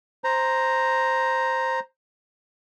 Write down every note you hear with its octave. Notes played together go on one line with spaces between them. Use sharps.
C5 A#5